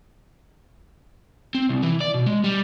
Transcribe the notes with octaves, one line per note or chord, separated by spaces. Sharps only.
C4
C2
E3
D5
B2
G#3
G3